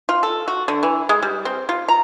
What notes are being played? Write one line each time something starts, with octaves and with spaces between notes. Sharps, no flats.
F4
A4
F#4
D3
E3
G#3
G3
C4
F4
A#5